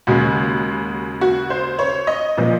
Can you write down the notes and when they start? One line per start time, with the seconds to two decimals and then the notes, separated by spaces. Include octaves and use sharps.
0.07 D#2 C#3 G#3 F#4
1.21 F#4
1.50 C5
1.79 C#5
2.07 D#5
2.37 A#2 F3